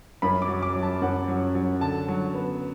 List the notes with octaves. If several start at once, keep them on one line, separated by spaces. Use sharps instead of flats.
F#2 B5
D6
F#3
D6
F#3
A5
F#2 F#5
F#3
F#3
D3 A5
F#3
B3